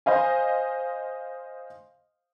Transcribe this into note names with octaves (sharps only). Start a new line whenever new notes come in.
C5 D#5 F5 G#5